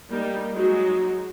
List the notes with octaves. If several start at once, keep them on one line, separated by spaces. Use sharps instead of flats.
G3 A#3 D#4
F#3 G#3 D#4 F#4